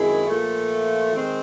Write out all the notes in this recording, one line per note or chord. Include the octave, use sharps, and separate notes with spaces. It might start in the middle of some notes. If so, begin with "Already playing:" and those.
Already playing: F#2 D#3 G#3 C4 E4 G#4
A#2 F3 A3
D#3 G#3 C4